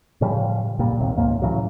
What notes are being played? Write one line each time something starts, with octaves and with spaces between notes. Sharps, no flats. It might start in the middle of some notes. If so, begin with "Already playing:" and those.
A2 C#3 F3 G3
A#2 G3
A#1 D#2 C3
C#2 G#2 A#3
A2 C#3 E3 F#3